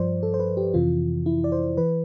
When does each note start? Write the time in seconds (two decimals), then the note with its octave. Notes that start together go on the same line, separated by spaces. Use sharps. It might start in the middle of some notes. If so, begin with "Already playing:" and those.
Already playing: G2 F3 C5 D5
0.23 A4
0.34 C5
0.40 B4
0.57 G4
0.74 F2 C3 E3 F4
1.26 E4
1.44 D5
1.52 C5
1.77 E3 B4